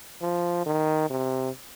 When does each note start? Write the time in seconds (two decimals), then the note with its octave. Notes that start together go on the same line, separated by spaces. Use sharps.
0.22 F3
0.66 D#3
1.10 C3